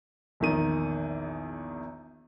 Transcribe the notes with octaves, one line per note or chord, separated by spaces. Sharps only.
A#1 E2 D#3 D#7